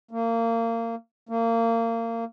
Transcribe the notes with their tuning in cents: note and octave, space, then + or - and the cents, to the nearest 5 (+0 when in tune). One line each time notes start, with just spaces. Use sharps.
A#3 -25
A#3 -25